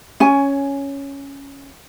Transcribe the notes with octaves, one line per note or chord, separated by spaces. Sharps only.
C#4 G#5